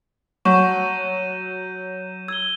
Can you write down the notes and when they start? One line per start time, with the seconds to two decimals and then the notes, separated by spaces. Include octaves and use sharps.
0.45 F#3 F#5 A5 C#6 G6 D#7 E7
0.71 D#7
2.28 E6 G#6 G7